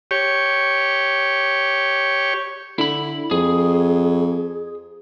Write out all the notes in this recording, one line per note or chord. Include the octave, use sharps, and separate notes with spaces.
G4 C#5
D3 E4 B5
F2 G#4